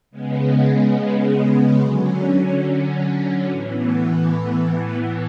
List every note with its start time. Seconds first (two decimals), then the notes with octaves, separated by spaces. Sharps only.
0.11 C#3 G#3 B3
1.80 D3 F#3 C#4
3.49 A2 E3 B3